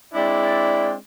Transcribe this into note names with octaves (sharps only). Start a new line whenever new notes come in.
G#3 C4 D4 E4 D5